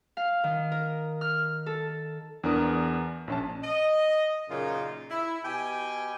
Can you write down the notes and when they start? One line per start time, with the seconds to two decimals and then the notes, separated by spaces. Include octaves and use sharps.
0.17 F5
0.44 D#3
0.72 A#4
1.21 F6
1.66 A4
2.44 E2 D4 A#4 D#6
3.28 A#1 C#4 A5
3.64 D#5
4.49 F#2 A#2 C#3 A#3 D#4 F4
5.11 E4
5.45 B2 G4 G5 G#5